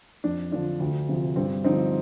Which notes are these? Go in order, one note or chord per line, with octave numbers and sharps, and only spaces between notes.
F2 D4
D3 F3 D4
D2
C3 F3
G2 C4
D3 F3 C4 D#4